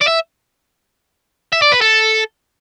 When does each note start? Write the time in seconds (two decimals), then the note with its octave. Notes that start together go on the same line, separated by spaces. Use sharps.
0.02 D5
0.08 E5
1.53 E5
1.62 D5
1.72 B4
1.81 A4